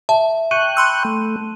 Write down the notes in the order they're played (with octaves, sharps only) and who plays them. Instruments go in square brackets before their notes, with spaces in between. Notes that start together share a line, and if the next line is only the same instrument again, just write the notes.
[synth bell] E5 [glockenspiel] A5
[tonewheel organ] G5 C#6 F#6 [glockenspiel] D#7
[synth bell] B5 C6 E6
[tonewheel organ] A3